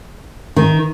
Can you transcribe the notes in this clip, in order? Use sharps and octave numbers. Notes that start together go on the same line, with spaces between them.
D#3